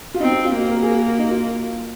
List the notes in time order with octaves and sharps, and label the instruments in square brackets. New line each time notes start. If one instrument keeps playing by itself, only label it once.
[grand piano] F4
[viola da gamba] C4 [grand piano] D#4
[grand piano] D#4
F4
[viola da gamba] A#3 [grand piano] F#4
[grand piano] A#4
G#4
F#4
F#4
D#4
F4